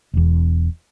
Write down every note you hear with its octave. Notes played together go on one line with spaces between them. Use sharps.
E1 E2